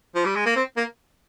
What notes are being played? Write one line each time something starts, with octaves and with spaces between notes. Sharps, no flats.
F3
G3
G#3
A#3
C4
A#3